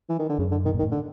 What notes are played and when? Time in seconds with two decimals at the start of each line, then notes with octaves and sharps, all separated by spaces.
0.09 E3
0.19 D#3
0.29 D3
0.38 F#2 C#3
0.51 D3
0.64 B2 D#3
0.74 A#2
0.79 D#3
0.82 A2
0.92 D3